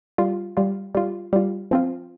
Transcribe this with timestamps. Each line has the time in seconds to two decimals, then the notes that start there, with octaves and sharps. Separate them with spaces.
0.18 G3 F4
0.57 G3 F4
0.95 G3 F4
1.33 G3 F4
1.71 F3 C4 F4